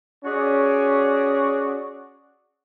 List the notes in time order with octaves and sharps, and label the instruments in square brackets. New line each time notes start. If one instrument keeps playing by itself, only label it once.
[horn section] C#4 F#4 G#4 D5